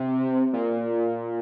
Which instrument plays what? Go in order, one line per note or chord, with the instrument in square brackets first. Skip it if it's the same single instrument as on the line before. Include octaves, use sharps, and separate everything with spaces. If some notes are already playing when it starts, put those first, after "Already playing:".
Already playing: [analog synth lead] C3
A#2